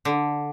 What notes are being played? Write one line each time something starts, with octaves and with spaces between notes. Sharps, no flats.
D3